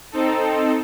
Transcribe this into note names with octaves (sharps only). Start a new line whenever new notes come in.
C4 D#4 A4